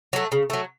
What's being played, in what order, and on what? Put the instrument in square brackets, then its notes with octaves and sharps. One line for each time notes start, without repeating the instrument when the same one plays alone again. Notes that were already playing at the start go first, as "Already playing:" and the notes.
[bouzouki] F#3 A3
C#3
F#3 A3